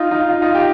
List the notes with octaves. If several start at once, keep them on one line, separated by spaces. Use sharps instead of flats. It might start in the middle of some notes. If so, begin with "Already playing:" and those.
Already playing: D#4 F4
D#4 F4
D#4 F4
G4